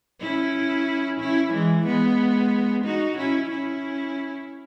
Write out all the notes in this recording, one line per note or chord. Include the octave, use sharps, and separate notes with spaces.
C#4 E4
C#4 E4
E3 G#3
G#3 B3
D#4 F#4
C#4 E4
C#4 E4